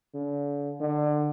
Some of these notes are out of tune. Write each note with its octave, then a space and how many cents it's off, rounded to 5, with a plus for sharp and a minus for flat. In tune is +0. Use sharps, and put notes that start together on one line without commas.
D3 -40
D3 +25